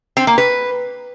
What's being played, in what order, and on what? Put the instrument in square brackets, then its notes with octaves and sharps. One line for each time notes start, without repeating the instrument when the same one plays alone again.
[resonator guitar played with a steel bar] C4
A#3
B4